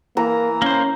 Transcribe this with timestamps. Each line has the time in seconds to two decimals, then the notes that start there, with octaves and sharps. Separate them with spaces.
0.17 E3 A#3 A#5
0.62 A#3 C#4 C5